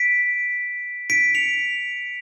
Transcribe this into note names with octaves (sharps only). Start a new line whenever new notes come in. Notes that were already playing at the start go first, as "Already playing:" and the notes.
Already playing: B6 D7
B6 D7
C#7 F7